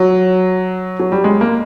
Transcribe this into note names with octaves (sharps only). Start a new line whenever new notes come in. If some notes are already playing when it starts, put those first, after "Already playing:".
Already playing: F#3
F#3
G3
G#3
A#3